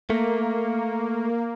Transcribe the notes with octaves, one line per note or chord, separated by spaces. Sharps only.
A3 A#3